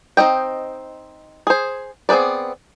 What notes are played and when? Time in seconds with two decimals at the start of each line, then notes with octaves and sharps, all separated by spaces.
0.17 C4 D#4 D#5 G5
1.47 G#4 C5
2.09 B3 C4 G#4 B4 D5